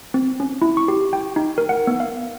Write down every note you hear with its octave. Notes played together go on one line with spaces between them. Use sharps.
C4
C#4
E4
C#6
G4
G5
D#4
A#4
F#5
B3
F5